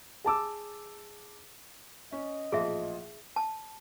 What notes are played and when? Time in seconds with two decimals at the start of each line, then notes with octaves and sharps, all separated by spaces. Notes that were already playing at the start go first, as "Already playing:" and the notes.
0.24 G#4 A5 D6 E6
2.12 C#4 D#5
2.52 A1 A#2 F3 G#4 E5
3.36 A5